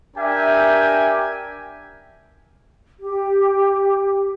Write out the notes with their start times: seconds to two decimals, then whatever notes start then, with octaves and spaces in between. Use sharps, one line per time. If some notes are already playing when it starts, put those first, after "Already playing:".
0.17 D4 G4 A#4 E5 G5 G#5
3.00 G4